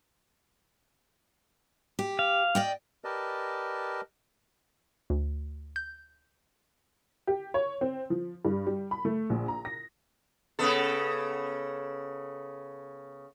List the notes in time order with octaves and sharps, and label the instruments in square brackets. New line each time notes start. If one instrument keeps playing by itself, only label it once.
[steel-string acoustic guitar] G4
[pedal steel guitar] F5
[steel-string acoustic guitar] D5 D#5 G5
[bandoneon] G4 A#4 B4 D5 D#5 A5
[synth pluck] D2
G6
[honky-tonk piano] G4
C#5
C4
F3
G2
G3
B5
A3
A#1
A#5
A#6
[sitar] C#3 B3 A4